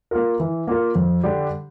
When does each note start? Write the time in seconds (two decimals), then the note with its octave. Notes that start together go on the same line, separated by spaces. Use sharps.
0.11 A#3 F4 A#4
0.40 E3
0.67 A#3 F4 A#4
0.95 F2
1.23 D3 G3 D4 G4